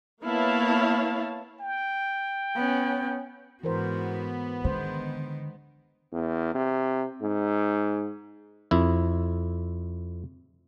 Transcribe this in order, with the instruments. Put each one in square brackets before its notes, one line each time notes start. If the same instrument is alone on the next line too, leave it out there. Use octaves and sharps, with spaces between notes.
[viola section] A#3 B3 E4 C#5 F5 A5
[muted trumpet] G5
[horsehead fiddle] B3 C#4
[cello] G#2 F#4 [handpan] E3 A#4 C5 [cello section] B3
[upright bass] D3 [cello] D#3 [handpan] G#3 C5
[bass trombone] E2
C3
G#2
[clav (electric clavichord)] F2 E4